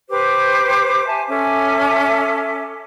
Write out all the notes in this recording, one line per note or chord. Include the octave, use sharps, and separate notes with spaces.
G4 B4 C5 D6
E5 G#5 A5
C#4 A4 E5 D6